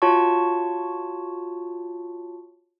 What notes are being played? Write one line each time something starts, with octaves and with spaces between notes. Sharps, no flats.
F4 F#4 C#5 A5 C#6